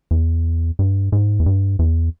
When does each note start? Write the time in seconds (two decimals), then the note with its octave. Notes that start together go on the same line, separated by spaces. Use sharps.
0.11 E2
0.79 G2
1.12 G#2
1.40 E2
1.46 G2
1.79 E2